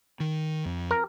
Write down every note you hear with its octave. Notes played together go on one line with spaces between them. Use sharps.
D#3
F2
A#4